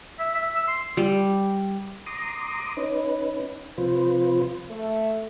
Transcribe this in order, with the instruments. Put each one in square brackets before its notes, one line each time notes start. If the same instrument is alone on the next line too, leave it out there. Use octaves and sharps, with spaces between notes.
[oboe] E5
E5
E6
C6
[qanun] G3
[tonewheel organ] A#5 C6 D6 D#6
C#4 D#4 B4
C3 F3 F4 B4 C5
[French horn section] A3